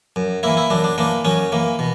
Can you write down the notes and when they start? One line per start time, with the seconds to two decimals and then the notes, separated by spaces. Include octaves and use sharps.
0.16 F#2
0.43 E3 A#3 E4
0.57 E4
0.70 F#2 D4
0.84 D4
0.98 E3 A#3 D4
1.25 F#2 C#4
1.52 E3 A#3
1.79 B2